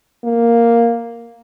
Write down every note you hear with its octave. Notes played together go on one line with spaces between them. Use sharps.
A#3